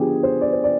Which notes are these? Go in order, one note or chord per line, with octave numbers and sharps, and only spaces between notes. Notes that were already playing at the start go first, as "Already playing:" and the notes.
Already playing: D3 F3 B3 G4 G#4
C5
D5
C5
D5